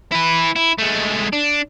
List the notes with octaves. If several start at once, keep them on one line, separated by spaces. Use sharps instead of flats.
E4 B4
E4
G#3 A3
D4